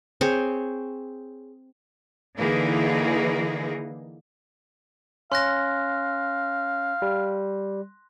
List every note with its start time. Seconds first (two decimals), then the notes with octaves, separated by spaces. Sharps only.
0.21 C4 G#4 C5 C#5
2.37 D3 E3 A#3 D#4 G#4
5.32 C#4 F5 C6 F#6 A#6
7.02 G3